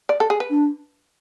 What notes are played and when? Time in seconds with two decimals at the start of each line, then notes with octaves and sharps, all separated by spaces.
0.09 D5
0.20 A4
0.30 G#4
0.40 B4
0.50 D4